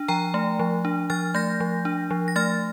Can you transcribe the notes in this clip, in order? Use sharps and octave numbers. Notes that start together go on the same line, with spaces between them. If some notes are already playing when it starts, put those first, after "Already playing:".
Already playing: D4
F3 G5 A#5
A3
F3
D4
F3 F6 A6
A3 G6 A#6
F3
D4
F3
A#6
A3 F6 A6